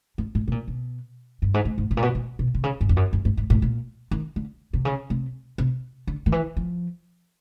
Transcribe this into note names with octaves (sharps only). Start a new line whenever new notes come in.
G2
A2
B2
A#2
B2
G2
G#2
A2
G#2
A2
A#2
B2
A#2
B2
C3
C#3
G2
F2
F#2
F#2
G2
G#2
A2
A#2
D#3
D3
C3
C#3
C3
C3
D3
D#3
E3
F3